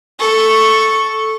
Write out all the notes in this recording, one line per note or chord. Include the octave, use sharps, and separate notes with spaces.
A4 C#6